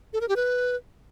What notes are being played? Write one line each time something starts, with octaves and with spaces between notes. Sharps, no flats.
A4
A#4
G4
B4